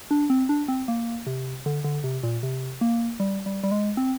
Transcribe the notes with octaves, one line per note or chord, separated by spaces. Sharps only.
D4
C4
D4
C4
A#3
C3
D3
D3
C3
A#2
C3
A#3
G3
G3
G3
G#3
C4